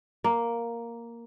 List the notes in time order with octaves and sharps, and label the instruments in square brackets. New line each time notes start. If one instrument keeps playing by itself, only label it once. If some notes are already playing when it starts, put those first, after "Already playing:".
[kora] A#3